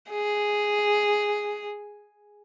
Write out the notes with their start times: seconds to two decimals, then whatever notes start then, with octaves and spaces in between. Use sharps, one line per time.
0.10 G#4